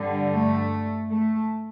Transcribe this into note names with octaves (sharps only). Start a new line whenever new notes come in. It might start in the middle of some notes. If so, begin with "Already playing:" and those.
Already playing: G2 D3 G3
A3
A3